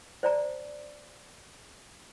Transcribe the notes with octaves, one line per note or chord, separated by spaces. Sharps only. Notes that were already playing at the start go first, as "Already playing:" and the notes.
C5 D5 A5 A#5